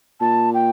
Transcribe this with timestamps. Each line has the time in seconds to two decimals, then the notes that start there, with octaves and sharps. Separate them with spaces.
0.20 A#2 A5
0.54 G5